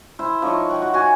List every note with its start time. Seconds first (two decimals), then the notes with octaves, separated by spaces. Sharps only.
0.19 E4 C5
0.42 F3 D#4 C#5 C#6
0.69 F#5 G5
0.82 F#4
0.94 F#4 G#5